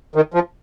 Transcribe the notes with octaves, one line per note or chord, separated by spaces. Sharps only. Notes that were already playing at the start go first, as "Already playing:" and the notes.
D#3
F3